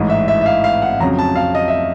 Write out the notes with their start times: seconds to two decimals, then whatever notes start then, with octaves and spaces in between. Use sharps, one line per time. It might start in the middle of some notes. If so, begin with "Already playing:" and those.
Already playing: A1 G#2 E3 G#3
0.10 E5
0.28 E5
0.41 E5
0.46 F5
0.64 F5
0.82 F#5
1.00 F2 C#3 F#3 A#5
1.19 A5
1.36 F5
1.55 D#5
1.68 E5